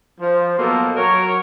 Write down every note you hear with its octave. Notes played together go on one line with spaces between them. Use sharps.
F3
B2 F#3 A#3 F4 A4
F#3 A#4 C#5